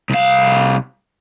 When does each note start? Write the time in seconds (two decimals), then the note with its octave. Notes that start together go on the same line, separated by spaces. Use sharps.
0.10 C2 F5